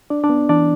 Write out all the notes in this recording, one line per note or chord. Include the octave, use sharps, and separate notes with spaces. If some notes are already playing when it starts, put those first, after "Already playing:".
D4 D5
D4 D5
B3
E3 D4 D5